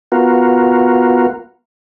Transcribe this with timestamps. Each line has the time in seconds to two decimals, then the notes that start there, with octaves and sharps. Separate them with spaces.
0.12 B3 F4 F#4 A#4